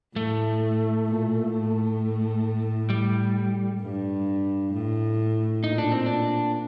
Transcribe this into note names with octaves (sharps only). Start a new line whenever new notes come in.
A2 A3
A#2
A2
G3
G2
A2
A#2 D#4
D4
C4
D4